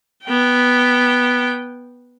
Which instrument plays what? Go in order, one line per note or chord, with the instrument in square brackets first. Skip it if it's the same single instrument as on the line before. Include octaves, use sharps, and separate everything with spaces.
[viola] B3 G5